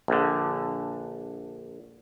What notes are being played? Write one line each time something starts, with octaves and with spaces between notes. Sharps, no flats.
A#1 D3